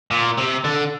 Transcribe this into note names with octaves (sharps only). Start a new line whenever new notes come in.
A#2
C3
D3